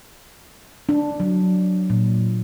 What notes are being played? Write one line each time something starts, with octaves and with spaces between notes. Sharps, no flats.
D4
F#3
A#2